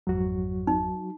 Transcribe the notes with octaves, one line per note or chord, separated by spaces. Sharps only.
G#1 F2 G#2 F#3 F#4
D#4